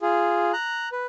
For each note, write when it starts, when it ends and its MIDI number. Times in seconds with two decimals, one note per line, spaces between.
0.01 0.52 65
0.01 0.52 68
0.53 0.89 82
0.53 0.89 90
0.92 1.07 71